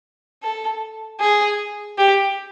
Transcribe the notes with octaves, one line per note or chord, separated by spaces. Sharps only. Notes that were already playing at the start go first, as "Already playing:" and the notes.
A4
G#4
G4